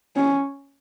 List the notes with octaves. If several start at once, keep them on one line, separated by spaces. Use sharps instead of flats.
C#4